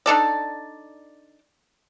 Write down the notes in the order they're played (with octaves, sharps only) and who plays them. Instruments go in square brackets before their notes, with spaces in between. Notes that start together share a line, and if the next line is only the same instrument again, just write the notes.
[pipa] D4 D#4 A4 D5